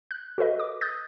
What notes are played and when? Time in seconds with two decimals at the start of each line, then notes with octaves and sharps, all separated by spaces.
0.11 F#6
0.38 F#4 A4 B4 D#5
0.60 D6
0.81 D#6 F#6 G6 A6